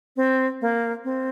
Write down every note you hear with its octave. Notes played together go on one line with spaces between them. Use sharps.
C4
A#3
C4